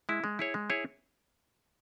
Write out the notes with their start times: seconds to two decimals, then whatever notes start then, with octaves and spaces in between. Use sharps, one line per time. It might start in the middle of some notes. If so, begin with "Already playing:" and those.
0.09 G#3 E4
0.24 G#3
0.39 E4 G#4 C#5
0.54 G#3
0.70 E4 G#4 C#5